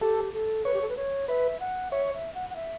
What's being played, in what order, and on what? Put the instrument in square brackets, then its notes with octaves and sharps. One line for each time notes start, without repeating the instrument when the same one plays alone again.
[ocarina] G4 [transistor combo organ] A4
[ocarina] A4
[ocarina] B4 [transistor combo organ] C#5
[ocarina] G4
A4
B4
C#5
[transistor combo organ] B4 [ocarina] E5
[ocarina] F#5
[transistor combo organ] C#5 [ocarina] E5
[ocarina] E5
F#5
F#5
E5